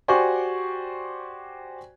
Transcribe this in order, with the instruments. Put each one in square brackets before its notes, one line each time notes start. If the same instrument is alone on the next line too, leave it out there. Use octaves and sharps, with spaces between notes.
[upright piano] F#4 G4 C5 D5 G#5 C#6